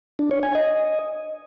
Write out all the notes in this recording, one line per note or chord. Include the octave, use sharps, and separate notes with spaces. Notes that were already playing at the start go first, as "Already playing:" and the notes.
D4
C#5
G#5
D#5